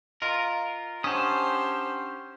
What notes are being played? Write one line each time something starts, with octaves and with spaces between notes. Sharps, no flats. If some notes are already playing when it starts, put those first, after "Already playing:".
F4 A#4 D#5 A#5
C#4 D4 G4 C5 F#5 A5 D#6 G6